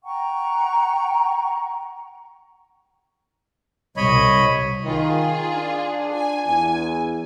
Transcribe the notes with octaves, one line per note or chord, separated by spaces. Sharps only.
F#5 G5 A#5 C#6
C2 C#5 D#5 B5
D#3 F4 G#4
D4
G#5
E2 G#5